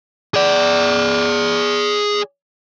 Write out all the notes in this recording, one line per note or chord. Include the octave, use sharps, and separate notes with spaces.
G#4 D5